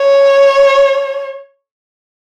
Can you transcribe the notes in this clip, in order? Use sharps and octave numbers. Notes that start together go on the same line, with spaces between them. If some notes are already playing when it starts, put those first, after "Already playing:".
Already playing: C#5